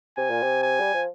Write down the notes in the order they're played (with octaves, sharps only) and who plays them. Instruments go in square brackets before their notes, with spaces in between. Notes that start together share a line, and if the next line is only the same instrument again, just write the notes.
[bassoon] C3 [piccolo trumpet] G#5
[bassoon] A#2
C3
[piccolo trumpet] G#5
[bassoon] G3
F3